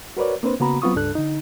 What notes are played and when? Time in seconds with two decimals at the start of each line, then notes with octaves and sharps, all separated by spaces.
0.17 F#4 A#4 B4 C#5 D5
0.43 A#3 C4 D4 B4 C5
0.60 C#3 A#3 B3 F#4 A#5 B5
0.82 F#3 B3 C4 F4 C#6 D#6
0.95 C#2 G2 D4 A4 F#6
1.15 D3 D#4